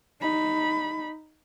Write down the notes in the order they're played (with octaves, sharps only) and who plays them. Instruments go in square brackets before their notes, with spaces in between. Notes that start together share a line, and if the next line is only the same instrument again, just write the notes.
[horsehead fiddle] D#4 B5